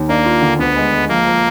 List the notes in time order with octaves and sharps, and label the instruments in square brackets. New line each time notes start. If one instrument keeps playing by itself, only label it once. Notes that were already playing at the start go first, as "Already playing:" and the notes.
Already playing: [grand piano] D#2
[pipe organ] A#3 [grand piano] D4
[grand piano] F4
D3
[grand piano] D2 [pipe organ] B3
[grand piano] G#3
G#3
[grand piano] F3 [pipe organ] A#3
[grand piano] F3